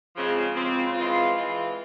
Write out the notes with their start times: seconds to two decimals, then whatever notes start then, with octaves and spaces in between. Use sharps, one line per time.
0.14 C#3 F3 G#3 C4
0.54 C#3 F3 G#3 C4
0.94 E3 G#3 C4 F4
1.34 E3 G#3 C4 F4